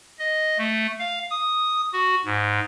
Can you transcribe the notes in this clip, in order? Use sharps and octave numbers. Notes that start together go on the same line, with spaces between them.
D#5
A3
F5
D#6
F#4
G#2